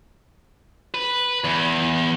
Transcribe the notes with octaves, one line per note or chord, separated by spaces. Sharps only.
B4
E2